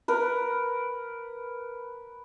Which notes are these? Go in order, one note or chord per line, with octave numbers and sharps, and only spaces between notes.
A#4 B4